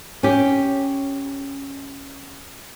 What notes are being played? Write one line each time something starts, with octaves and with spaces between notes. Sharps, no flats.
C#4 G4